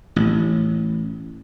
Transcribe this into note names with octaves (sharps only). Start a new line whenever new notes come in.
A1